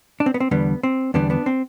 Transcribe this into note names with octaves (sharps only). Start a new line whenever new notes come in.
D4
C4
B3
C4
E2 D3 G3 B3
C4
E2 D3 G3 B3 D4
B3 D4
C4